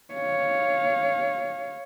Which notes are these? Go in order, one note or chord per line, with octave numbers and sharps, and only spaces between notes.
C#5 F5